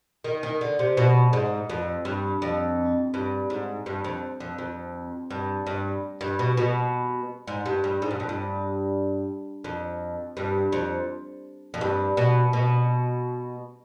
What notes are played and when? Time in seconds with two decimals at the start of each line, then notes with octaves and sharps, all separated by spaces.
0.24 D#3
0.43 D#3
0.61 D3
0.79 C3
0.97 B2
1.33 G#2
1.70 F2
2.05 G2
2.42 F2
3.14 G2
3.50 G#2
3.86 G2
4.04 F2
4.40 F2
4.58 F2
5.30 G2
5.67 G2
6.21 G2
6.39 B2
6.57 B2
7.47 G#2
7.66 G2
7.84 G2
8.02 G#2
8.11 G2
8.20 F2
8.29 G2
9.64 F2
10.37 G2
10.72 F2
11.74 F2
11.81 G2
12.17 B2
12.53 B2